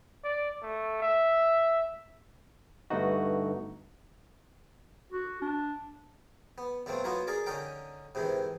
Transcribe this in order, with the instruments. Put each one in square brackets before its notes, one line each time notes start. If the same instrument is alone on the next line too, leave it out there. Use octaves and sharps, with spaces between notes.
[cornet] D5
A3
E5
[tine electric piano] G2 D3 A3 B3 D#4 F#4
[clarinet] F#4
D4
[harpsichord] B3
F#2 B2 A3 A#3 C4
F#3 A#3 B3 D#4 F4 F#4
G#4 A#4 D5
D3 C#4 D#4 A#4 G5
G#2 C3 D#3 E3